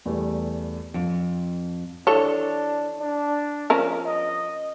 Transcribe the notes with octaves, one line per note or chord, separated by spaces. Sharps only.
E2 G3 A3
F2
E3 D4 A4 C#5
D4
F3 C#4 A#4
D#5